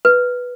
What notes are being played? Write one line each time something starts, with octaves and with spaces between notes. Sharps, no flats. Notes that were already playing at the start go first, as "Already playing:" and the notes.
B4